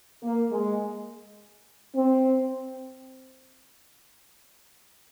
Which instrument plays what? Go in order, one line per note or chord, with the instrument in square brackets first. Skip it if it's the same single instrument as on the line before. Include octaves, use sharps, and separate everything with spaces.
[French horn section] A#3
G#3
C4